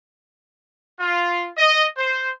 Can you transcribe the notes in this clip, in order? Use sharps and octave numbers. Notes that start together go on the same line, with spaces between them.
F4
D#5
C5